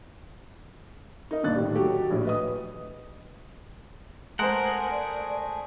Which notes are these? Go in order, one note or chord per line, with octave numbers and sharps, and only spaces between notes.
D#4 A#4 D#5
G1 A#2 D4 F#6 A6
A2 D#3 G3
F#3 F#4 G4 A4
A#1 A2
B4 D#5 D#6
G#3 A3 G#4 A#4 C5 F#5
D5